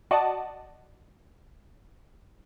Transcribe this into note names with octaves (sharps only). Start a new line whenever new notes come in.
F#4 D5 D#5 F#5 A5